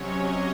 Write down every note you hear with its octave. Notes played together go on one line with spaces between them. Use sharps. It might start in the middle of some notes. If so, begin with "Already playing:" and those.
Already playing: C3 F#3 C#4 C#5 D#5